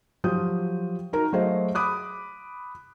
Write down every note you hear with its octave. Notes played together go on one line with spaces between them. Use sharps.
F3 F#3 F4 G4 D#6 G6
D#4 F#4 A#4 A#5
F#3 A3 G#4 C5 D#5 F5
B5 D6 D#6 F#6